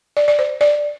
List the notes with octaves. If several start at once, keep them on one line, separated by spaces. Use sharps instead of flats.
D5
D5
C5
D5